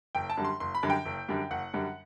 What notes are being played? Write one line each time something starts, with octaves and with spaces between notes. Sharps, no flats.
F#1 G5
A5
F#2 D3 G3
C6
F#1 C6
B5
F#2 D3 G3
G5
F#1
F#2 D3 G3
F#1 F#5
F#2 D3 G3